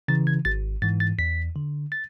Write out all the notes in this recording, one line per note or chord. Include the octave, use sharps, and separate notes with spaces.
C#3 E3 A6
G#6
G#1 A6
G#2 E3 A6
A6
E2 B6
D3
A6